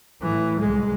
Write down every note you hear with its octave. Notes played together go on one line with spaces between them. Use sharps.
A2 E3
C2 G#3